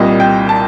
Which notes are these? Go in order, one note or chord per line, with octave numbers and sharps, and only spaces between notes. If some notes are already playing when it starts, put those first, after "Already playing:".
Already playing: C2 A#2 G3 D#5
G5
A5